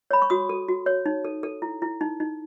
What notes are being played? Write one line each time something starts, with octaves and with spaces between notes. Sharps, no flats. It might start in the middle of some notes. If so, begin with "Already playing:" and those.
C#5 B5
C#6
F#4 D#6
A4
F#4
C#5
D#4
A4
A4
E4
E4
D#4
D#4